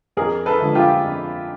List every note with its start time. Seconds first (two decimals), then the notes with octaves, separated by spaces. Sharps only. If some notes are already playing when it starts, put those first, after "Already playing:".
0.17 F2 G#4 A#4
0.46 A4 B4
0.60 D3 F3 G#3
0.75 F4 G4
1.04 F2